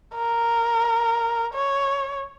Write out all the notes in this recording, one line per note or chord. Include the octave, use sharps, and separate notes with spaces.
A#4
C#5